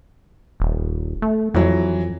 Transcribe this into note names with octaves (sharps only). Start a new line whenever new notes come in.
D#1
A3
F2 E3 F#3